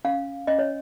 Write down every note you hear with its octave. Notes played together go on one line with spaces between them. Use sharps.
C#4 F5
C#4 D#5
C#5